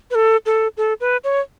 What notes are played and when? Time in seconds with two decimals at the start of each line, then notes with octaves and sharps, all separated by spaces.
0.11 B4
0.15 A4
0.46 A4
0.77 A4
1.01 B4
1.24 C#5